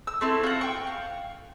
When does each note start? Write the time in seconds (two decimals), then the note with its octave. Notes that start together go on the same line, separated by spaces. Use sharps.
0.07 E6
0.21 A3 C4 E4
0.43 F4 F#4 F#5
0.61 G5 C#6
0.87 F5